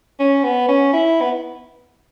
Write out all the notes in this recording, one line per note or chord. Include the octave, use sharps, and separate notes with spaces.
C#4
B3
C#4
E4
B3